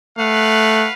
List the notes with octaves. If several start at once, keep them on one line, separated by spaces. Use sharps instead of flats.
A3 B4 F5 F#5